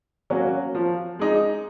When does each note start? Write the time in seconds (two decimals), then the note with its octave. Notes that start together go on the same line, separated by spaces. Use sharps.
0.30 F#3 A#3 C#4 F#4
0.75 F3
1.19 G#3 D#4